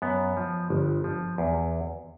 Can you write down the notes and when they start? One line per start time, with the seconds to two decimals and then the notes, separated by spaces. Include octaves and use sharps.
0.02 F#2 B3
0.37 F3
0.70 G1
1.04 F3
1.38 E2